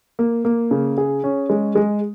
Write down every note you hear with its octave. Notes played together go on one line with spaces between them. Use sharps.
A#3
A#3
C#3
G#4
C#4
G#3
G#3